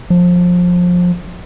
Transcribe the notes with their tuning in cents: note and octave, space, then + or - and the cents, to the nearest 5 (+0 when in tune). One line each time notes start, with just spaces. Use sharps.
F3 +25